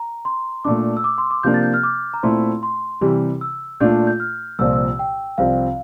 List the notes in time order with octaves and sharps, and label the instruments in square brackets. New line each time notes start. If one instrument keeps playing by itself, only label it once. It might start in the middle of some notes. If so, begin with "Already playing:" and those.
Already playing: [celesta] A#5
C6
[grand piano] A#2 A3 D4 [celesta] D6
[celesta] E6
D6
C6
D6
[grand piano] C3 F3 A#3 D4 [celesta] G6
[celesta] A6
G6
F6
D6
A#5
[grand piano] A#2 A3 C4 E4 [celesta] C6
[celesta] C6
[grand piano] C3 E3 G3
[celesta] E6
[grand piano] A#2 A3 D4 F4 [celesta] G6
[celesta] G6
F6
[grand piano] C2 A#2 F3 C4 [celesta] E6
[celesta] E6
G5
[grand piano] C2 C3 F3 C4 [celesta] F5